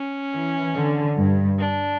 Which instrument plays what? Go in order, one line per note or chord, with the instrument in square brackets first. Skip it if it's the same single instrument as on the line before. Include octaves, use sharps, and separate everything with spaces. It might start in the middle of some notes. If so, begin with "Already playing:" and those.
Already playing: [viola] C#4
[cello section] E3
D3
G2
[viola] D4